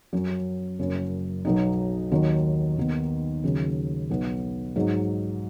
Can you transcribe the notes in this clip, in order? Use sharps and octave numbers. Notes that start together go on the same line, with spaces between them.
F#2 F#3 C#4
F#1 F#2 F#3
B1 B2 F#3 B3 D#4
D#2 D#3 F#3 D#4
D#2 D#3 B3 D#4
D#2 C#3 F#3
B1 B2 B3 D#4
G#2 F#3 D#4